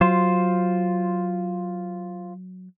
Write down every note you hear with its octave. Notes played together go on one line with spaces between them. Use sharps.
F#3 F4 C5